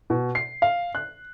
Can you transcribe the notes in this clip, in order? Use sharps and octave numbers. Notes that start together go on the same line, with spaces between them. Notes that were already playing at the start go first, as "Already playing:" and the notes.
B2
C7
F5
F#6